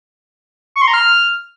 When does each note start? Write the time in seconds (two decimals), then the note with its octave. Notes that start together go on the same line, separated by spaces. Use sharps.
0.76 C#6
0.82 C6
0.88 A#5
0.94 F6